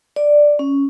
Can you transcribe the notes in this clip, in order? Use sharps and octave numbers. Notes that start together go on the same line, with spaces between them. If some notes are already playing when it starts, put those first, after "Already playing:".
D5
C#4